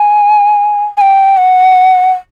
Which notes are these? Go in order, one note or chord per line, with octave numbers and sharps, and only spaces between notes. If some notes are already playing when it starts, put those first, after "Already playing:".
Already playing: G#5
G#5
G5
F#5